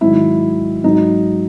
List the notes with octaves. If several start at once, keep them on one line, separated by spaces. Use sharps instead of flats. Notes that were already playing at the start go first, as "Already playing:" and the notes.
G#2 D#3 F#3 E4
G#2 F#3 D#4